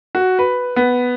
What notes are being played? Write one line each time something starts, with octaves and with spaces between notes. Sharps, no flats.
F#4
B4
B3